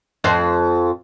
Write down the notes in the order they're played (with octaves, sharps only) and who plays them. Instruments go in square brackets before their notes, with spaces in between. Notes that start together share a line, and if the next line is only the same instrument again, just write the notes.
[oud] F2 C5